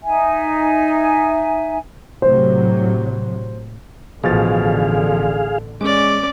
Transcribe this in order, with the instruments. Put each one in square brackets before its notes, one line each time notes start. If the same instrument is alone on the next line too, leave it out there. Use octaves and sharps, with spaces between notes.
[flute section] D#4 E5 G#5
[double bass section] A2 C3 F#3 [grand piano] C5
[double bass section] A1 D3 [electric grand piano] B2 F3 A6 [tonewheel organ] G#4 F5
[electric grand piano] G#3 [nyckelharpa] C#4 D5 [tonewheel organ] D6